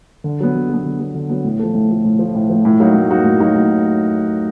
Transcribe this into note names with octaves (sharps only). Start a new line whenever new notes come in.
D3
F#3 B3
D3
F#3 B3
D3
F#3 B3
D3
F#3 B3
A2
F3 A3
A2
F3 A3
A2
F3 A3
A2
F3 A3
A2
F#3 A#3 D#4 F#4
A2
F#3 A#3 D#4 F#4
A2
F#3 A#3 D#4 F#4
A2